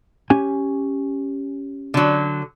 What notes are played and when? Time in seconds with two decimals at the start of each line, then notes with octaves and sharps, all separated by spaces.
0.30 C#4 G4 G#5
1.94 D3 F#3